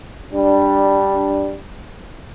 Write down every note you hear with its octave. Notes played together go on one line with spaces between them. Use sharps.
G3 D4